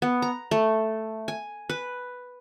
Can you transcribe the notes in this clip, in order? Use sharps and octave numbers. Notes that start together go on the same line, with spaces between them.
B3
A#5
A3
G#5
B4